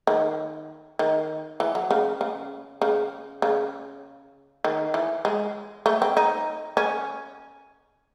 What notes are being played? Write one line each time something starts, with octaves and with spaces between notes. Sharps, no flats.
D#3
D#3
E3
F#3
C#3
C#3
C#3
C#3
D#3
E3
G#3
A3
C4
D#4
C#4